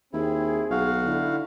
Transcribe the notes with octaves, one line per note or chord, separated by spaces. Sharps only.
D#2 C4 E4 G#4
B1 F#4 F5
D3 E4